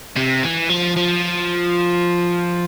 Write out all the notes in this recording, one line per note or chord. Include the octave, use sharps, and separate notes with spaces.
C3
E3
F3
F3